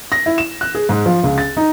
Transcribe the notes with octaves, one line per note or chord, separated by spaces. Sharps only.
A#6
E4
E7
F#6
G#4
G#2
F3
C#2
A6
D#4